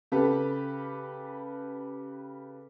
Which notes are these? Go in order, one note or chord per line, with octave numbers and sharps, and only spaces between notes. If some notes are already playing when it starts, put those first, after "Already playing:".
C#3 G4 A4 B4